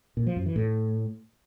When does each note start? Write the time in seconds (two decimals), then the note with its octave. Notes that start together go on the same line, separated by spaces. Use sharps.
0.17 A#2
0.27 F3
0.36 F#2
0.46 E3
0.56 A2